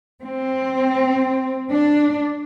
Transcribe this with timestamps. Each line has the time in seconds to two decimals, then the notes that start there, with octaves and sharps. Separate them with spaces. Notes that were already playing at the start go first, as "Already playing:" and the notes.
0.23 C4
1.70 D4